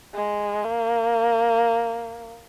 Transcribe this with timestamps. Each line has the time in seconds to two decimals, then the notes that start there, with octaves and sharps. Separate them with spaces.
0.14 G#3
0.65 A#3